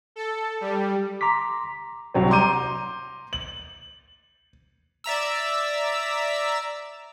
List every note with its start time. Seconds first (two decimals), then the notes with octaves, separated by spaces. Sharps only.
0.16 A4
0.61 G3
1.21 A#5 C6 D6 B6
2.14 C2 F#3 C4
2.30 A#5 C6 D6 G6 D#7
3.33 F#7
5.04 D5 E5 A#5 E6